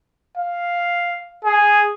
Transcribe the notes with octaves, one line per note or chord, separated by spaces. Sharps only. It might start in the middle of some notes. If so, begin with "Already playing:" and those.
F5
G#4